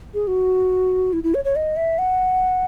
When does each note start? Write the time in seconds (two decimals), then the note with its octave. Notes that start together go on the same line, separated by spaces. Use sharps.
0.14 G#4
0.27 F#4
1.13 E4
1.23 E4
1.34 C#5
1.44 C#5
1.56 D#5
1.77 E5
1.98 F#5